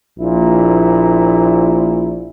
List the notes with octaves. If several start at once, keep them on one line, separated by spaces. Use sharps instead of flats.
A#1 A#2 E4